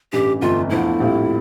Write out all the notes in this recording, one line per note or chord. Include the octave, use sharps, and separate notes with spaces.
A1 G2 E3 G4
G1 F2 E3 A3 F4
E2 D3 F3 A3 E4
A#1 A2 G3 C4 F4